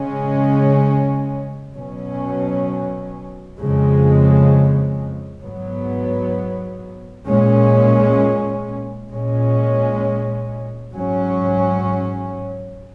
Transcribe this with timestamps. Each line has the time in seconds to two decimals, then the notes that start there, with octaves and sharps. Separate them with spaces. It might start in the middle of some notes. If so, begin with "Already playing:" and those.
Already playing: C#3 G#3 C#4
1.75 B2 F#3 C#4
3.59 F2 C#3 G#3
5.42 G#2 F#3 B3
7.26 A#2 G#3 C#4
9.09 A#2 G#3 C#4
10.93 G#2 F#3 C#4